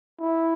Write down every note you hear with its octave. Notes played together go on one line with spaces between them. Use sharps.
E4